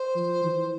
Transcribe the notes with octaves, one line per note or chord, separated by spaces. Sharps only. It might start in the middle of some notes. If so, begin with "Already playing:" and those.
Already playing: C5
F3
E3